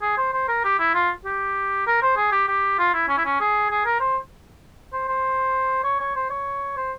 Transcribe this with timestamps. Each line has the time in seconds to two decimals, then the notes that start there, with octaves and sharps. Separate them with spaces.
0.02 G#4
0.18 C5
0.33 C5
0.48 A#4
0.65 G4
0.79 E4
0.94 F4
1.25 G4
1.87 A#4
2.02 C5
2.17 G#4
2.32 G4
2.48 G4
2.79 F4
2.94 E4
3.09 C#4
3.17 E4
3.25 C#4
3.40 G#4
3.70 G#4
3.86 A#4
4.00 C5
4.93 C5
5.08 C5
5.84 C#5
6.00 C#5
6.15 C5
6.30 C#5
6.77 C5